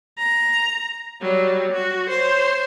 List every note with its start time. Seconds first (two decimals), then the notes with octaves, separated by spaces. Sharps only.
0.18 A#5
1.21 F#3 G3
1.72 F#4
2.10 C5 C#5